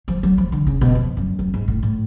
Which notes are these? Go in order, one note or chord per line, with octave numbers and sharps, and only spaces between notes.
F3
F#3
F3
D3
C#3
B2
F2
F#2
F#2
G#2
A2
A2